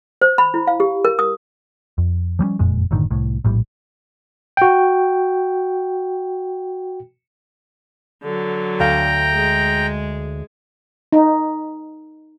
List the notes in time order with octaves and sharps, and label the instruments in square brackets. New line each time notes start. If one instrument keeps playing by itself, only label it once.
[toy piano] C5
B5
E4
F5
G4
A#4
D#6
[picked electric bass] F2
F3 G3 A#3 C#4
F#1 F2 A#2 G#3
F#1 A2 D3 D#3
C2 A2
A#1 A2 G3
[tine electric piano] F#4 G5
[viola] D3 F#3
[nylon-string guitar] D2 F5 [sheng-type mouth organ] G5 A#5
[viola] G#3 G#4
[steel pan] D#4